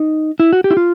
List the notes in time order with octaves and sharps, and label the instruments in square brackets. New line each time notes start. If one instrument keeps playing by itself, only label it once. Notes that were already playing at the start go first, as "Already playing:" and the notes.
Already playing: [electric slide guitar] D#4
E4
F#4
G4
E4
F4